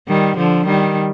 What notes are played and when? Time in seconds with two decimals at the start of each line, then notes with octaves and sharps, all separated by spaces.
0.08 D#3 G3
0.37 D3 F3
0.66 D#3 G3